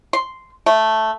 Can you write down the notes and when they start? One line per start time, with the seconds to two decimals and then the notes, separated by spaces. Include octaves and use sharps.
0.13 C6
0.66 A3